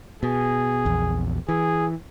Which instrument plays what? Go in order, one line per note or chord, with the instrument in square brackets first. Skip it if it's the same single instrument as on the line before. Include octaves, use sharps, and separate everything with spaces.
[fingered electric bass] B2 [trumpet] G#4
[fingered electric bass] A#1 E2
[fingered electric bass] E3 [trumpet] G#4